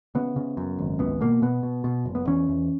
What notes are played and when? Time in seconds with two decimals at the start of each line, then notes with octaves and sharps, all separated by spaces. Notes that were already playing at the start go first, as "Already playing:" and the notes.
0.15 C#3 B3
0.36 C#3
0.57 F#2
0.79 G#1
0.99 C#2 B3
1.21 B2 A#3
1.42 B2 B3
1.63 B2
1.84 B2
2.05 F#1
2.15 B3
2.27 E2 C#4
2.49 E2